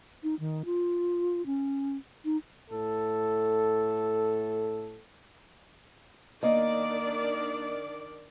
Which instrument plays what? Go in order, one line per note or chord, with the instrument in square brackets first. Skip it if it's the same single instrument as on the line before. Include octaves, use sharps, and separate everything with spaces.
[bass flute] D#4
D#3
F4
C#4
D#4
[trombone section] A2 A4
[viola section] D#3 D4 D5 [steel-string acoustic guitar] A#3 D#5